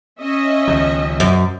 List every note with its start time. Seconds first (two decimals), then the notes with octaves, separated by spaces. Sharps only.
0.20 C#4 D#5 E5
0.68 C#2 D#3 F3
1.20 F#2